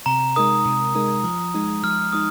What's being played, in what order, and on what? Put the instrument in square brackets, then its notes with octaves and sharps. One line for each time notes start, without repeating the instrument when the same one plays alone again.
[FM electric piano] C3 [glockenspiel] A#5
[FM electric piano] G#3 D#4 A#4 [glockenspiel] D#6
[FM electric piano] C3
G#3 D#4 A#4
F3
G#3 D#4
[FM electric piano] F3 [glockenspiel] F6
[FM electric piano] G#3 D#4 [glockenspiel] D#6